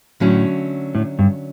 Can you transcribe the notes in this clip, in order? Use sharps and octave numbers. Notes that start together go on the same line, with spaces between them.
A2 D3 F#3 A3 C#4
A2
G2